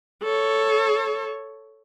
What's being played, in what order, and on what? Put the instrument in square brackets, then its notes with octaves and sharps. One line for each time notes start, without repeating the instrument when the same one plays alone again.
[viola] A4 C#5